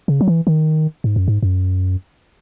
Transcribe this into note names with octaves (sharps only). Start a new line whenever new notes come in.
C#3
F#3
E3
D#3
G#2
F#2
G#2
F#2